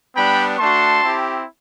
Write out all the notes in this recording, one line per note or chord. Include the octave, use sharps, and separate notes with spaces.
G3 B3 D4 G5 B5
A3 D4 F#4 A5 C6
C4 E4 G4